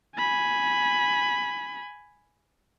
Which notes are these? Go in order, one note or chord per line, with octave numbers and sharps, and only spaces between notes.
G#5 B5